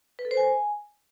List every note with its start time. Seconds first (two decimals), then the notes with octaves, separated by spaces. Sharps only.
0.19 B4
0.25 A4
0.31 C5
0.37 G#5